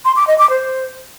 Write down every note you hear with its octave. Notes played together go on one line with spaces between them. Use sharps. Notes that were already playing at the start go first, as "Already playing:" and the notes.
C6
D6
D#5
D6
C5